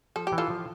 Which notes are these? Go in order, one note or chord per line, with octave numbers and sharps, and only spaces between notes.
F3 A4
G4
E3
F4 A4
F3